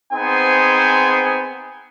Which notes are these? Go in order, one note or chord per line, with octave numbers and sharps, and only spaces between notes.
B3 C4 D#4 G#4 C5 G#5